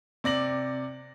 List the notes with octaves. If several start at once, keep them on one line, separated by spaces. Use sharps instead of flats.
C3 D5 A#6 F#7